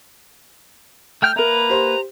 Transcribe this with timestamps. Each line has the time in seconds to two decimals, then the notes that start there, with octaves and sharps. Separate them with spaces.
1.22 A3 G5 F6 G6
1.36 A#3 A#4 B4 E5 A#5
1.70 G4 C5